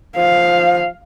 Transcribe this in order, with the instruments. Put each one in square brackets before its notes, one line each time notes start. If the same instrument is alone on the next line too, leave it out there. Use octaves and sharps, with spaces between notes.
[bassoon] F3 [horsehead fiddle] F5